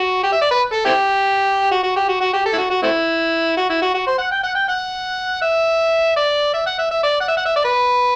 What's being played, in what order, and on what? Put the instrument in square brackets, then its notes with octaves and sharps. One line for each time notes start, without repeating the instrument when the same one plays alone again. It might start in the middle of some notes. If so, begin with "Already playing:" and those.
Already playing: [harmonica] F#4
G4
E5
D5
B4
A4
C4 E4 G4
F#4
F#4
G4
F#4
F#4
G4
A4
E4
F#4
F#4
A3 C4 E4
F#4
E4
F#4
F#4
C5
F#5
G5
F#5
G5
F#5
E5
D5
E5
F#5
E5
E5
D5
F#5
E5
F#5
E5
D5
B4